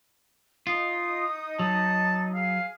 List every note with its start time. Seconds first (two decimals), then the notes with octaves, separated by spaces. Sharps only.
0.67 D#4 F4 D#6
1.59 F#3 A5
2.34 G#4 F5